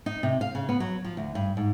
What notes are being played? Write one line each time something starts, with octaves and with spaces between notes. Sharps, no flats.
D#4
C3
F5
C#3
B3
F#3
F3
D2
G2
G#2